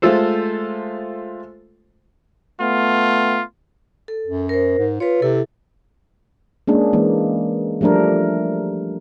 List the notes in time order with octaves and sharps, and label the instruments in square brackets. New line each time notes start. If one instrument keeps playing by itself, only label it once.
[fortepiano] G#3 A3 F4 A4 C5
[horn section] A3 B3 F4
[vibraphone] A4
[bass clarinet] F#2
[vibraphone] A#4 C5
[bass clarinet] G#2
[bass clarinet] F4 [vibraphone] B4 C#5
[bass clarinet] C3 [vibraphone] E4 A4
[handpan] G#3 A#3 C#4 D4 G#4
E3 G#3 A#3
F3 G3 A3 D4 A#4